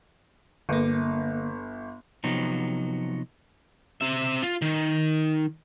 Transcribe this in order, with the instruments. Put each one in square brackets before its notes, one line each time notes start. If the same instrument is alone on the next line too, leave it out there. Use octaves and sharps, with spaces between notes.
[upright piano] G1 [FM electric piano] D3 A#3
[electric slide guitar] C3 F3 F#3 B3 D#4
[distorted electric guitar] C4 E5
F4
D#3